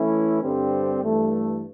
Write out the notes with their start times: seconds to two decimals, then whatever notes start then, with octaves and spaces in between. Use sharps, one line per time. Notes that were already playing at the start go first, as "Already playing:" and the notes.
Already playing: E3 A3 C#4 E4
0.42 G2 D3 G3 C4
1.02 G2 E3 A3